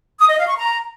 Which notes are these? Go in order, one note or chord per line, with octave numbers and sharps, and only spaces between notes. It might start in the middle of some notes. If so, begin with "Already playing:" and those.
D#6
D#5
F5
C#6
A#5